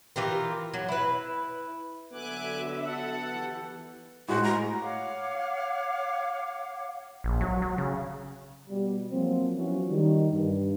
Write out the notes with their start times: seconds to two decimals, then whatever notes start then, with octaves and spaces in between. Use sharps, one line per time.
0.16 E3 F4 G4 A#4
0.74 F#3
0.88 E4 B4
2.13 D3 F#3 B3 E5 G#5 D6 F#6
2.78 A4 F#5
3.34 E3 G4
4.28 A2 G#3 F#4 C5
4.43 A#5
4.80 C#5 F5 F#5 D6
7.24 A#1
7.41 F#3
7.62 F#3
7.78 C#3
8.69 B2 G3
9.10 F3 F#3 A#3 C4
9.56 F3 F#3 B3 C#4 E4 F#4
9.88 D#3 G3
10.31 G2